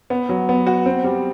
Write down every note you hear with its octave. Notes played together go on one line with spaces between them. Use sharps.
B3
F#3
B3
F#4
C4
G3